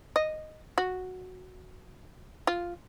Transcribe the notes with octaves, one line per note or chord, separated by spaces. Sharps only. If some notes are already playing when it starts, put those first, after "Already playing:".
D#5
F#4
F4